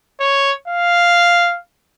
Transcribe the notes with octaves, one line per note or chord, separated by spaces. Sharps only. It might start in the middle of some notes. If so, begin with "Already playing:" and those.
C#5
F5